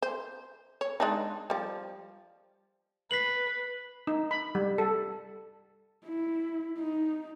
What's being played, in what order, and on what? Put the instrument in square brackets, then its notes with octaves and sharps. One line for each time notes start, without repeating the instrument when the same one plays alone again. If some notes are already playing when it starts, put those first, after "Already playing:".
[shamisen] C5
C#5
G#3 D4 D#4
F3 G3
[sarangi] B4 [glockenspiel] B6 C7 F#7
[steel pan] D#4
B5
G3
A4
[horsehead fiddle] E4
D#4